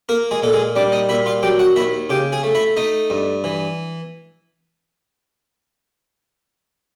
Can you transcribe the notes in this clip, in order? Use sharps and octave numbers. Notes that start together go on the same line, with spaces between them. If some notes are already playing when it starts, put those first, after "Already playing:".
A#3 A#4
G#3 G#4
A#2 A4
G#3 G#4
G3 D4 D5
D#4 D#5
A#2 E4 E5
F4 F5
F#3 G4 G5
F#4 F#5
D#2 E4 E5
C#3 G4 G5
G#4 G#5
A3
E4 E5
A3 D#4 D#5
G2
E3